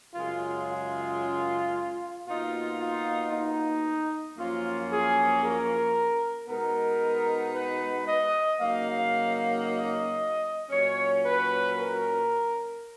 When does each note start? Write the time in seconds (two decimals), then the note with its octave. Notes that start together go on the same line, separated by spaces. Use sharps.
0.15 F#2 C#3 G#3 F4
0.68 F4
2.26 B2 A#3 D#4 F4
2.79 F4
3.32 D#4
4.37 F#2 F3 A#3 C#4 F4
4.90 G#4
5.43 A#4
6.48 B2 G#3 B3 D#4 A#4
7.54 B4
8.06 D#5
8.60 C#3 F#3 A#3 D#4 F5
9.66 D#5
10.70 A#2 F#3 C#4 C#5
11.23 B4
11.76 A#4